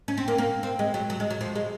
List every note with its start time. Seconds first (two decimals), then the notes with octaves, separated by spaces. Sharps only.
0.08 C#4
0.17 C4
0.28 A#3
0.38 A#3
0.63 C4
0.79 G#3
0.94 F#3
1.10 F#3
1.20 G#3
1.30 F#3
1.41 F3
1.55 G#3